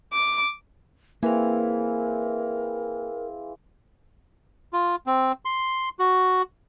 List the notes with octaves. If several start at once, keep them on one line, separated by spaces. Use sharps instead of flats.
D6
E3 A#3 C4 G#4 A#4 F5
F4
C4
C6
F#4